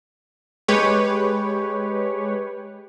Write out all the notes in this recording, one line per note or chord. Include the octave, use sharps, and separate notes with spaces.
G#3 G4 B4 C#5